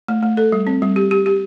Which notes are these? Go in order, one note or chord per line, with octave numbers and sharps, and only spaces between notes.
A3
A3
A4
G3
C4
G3
G4
G4
G4